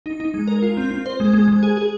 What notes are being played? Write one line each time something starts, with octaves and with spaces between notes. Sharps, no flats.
D#4
D#4
G#3
A#4
F4
C4
C4
C5
G#3
G#3
G#3
G#4
G#4